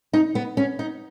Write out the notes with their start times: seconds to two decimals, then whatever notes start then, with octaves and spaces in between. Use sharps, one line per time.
0.13 D#4
0.35 B3
0.57 C#4
0.79 D#4